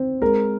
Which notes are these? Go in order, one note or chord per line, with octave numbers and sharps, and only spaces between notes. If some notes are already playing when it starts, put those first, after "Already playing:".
Already playing: C4
G#3 A#4